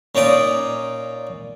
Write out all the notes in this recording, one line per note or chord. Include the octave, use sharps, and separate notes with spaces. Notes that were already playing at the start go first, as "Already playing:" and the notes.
A#2 C#4 D#4 D5 D#6